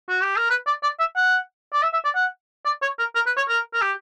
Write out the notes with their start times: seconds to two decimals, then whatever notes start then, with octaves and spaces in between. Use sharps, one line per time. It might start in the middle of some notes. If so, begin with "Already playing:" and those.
0.09 F#4
0.22 G4
0.37 A#4
0.50 B4
0.67 D5
0.83 D5
1.00 E5
1.17 F#5
1.73 D5
1.83 E5
1.93 E5
2.05 D5
2.15 F#5
2.65 D5
2.82 C#5
2.99 A#4
3.15 A#4
3.26 B4
3.37 C#5
3.49 A#4
3.74 A#4
3.82 G4